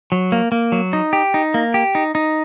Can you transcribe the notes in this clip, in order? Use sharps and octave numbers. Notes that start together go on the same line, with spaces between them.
F#3
A#3
A#3
F#3
D#4
G4
D#4
A#3
G4
D#4
D#4